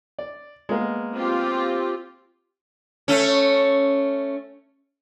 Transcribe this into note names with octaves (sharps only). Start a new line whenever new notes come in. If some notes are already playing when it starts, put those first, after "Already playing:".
D5
G#3 A#3 B3
C4 F4 G4
A3 C#4